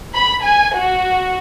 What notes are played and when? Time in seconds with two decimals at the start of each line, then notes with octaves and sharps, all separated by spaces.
0.15 B5
0.43 G#5
0.76 F#4